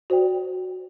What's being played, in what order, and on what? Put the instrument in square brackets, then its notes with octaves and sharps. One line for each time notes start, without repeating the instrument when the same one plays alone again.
[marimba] F#4 C5 D5 G5